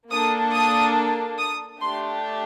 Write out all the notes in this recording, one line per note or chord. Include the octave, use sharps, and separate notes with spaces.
A#3 D4 A4 D#6
D#6
D#6
A3 D4 G4 C6